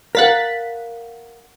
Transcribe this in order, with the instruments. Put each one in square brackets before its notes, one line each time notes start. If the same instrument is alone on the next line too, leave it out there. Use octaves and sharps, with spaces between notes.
[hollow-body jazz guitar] A#4 F5 F#5 [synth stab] F#6 A6 B6